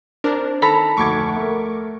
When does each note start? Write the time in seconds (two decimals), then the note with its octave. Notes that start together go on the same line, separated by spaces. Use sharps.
0.24 C4 D4 A#4
0.62 D#3 A4 A#5 B5
0.97 F1 D2 C#6 D6 G#6
1.36 A3 A#4